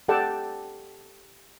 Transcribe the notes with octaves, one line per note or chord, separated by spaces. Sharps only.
G4 A4 D5 F#5 G5 A5